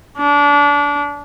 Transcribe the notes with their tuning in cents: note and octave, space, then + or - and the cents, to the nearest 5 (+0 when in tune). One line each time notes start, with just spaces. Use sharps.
D4 -25